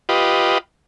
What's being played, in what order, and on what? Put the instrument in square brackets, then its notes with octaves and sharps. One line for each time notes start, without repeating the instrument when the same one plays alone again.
[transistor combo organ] F4 G4 B4 D#5